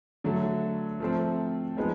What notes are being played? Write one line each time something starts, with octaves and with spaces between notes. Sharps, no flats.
D3 F#3 A3
F3 A3 C4
F3 G#3 B3 D#4